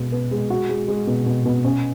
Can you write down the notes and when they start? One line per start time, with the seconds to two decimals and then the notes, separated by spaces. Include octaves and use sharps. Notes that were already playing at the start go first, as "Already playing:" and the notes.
Already playing: B2 G#3 B3
0.12 B3
0.31 G#3
0.50 F#4
0.69 G#3
0.88 G#3
1.07 B2
1.26 B2
1.45 B2
1.64 C#4